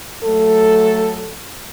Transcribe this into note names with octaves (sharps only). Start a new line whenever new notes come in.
F#3 A3 A4